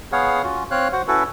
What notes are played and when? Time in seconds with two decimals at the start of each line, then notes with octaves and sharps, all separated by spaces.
0.12 B3 G#4 C#5 F5 F#5
0.44 C#4 F4 F#4
0.71 C4 C#5 F5 F#6
0.93 F#4 C5 F#5
1.08 C#4 E4 F#4 A4 B4